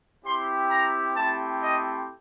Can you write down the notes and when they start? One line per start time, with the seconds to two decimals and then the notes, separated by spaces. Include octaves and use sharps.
0.23 C4 E4 G4 C6
0.70 A#5
1.16 A3 C4 E4 G4 A5
1.62 D#5